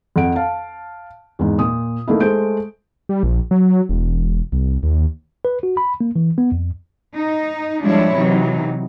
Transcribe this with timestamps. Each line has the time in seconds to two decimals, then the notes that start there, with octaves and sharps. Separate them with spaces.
0.16 F2 F#5 D7
0.36 F5 A5
1.39 E2 G#2
1.59 A#2 D#6
2.07 A3 A#3 D#4 E4
2.20 G#3 A3 C5 G6 D7
3.09 G3
3.23 A#1
3.51 F#3
3.89 E1
4.52 C2
4.83 D#2
5.45 B4
5.63 F#4
5.77 B5
6.01 A#3
6.16 E3
6.38 B3
6.52 F2
7.16 D#4
7.83 F3 G3 G#3 D4 E4 C#5
8.16 C3 E3 F#3 D#4